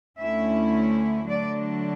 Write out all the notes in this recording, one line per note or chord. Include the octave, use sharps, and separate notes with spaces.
D2 D3 A3 C#4 E4 E5
D3 F#3 A3 D4 D5